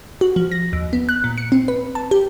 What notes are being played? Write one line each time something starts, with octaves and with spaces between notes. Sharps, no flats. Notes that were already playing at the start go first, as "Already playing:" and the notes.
F#4
F3
A#6
D#2
B3
F#6
A#2
C#7
C4
B4
A5
G4